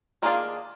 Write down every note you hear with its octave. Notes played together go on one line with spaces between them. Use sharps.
D#3 A#3 D4 F4 G#4 D5